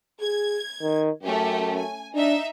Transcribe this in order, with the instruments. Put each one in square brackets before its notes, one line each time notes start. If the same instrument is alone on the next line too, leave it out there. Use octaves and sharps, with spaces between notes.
[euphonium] G#4 [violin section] G#6
[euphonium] D#3
[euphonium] F#2 [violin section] A3 C#4 G4
[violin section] G#5
[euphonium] D4 [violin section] D#4 E5